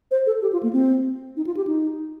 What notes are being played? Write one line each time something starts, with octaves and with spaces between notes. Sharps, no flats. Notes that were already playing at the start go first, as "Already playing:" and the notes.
C5
A4
G4
F4
A#3
C4
D#4
F4
G4
D#4